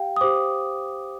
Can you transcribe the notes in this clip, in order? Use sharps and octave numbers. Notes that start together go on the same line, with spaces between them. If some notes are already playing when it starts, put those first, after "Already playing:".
Already playing: G4 F5 G5
D#6
G4 C5 D6